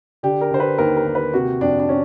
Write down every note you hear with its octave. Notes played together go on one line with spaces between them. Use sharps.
D3 G4
A#4
D3 C5
B4
D#2 A#4
A#4
D#2
B4
C3 F#4
F2 D4
D4
C#4